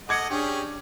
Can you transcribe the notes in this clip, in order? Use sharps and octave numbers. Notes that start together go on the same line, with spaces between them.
A4 D#5 F#5 D6 G#6 C#7
C#4 D4 G4 G#4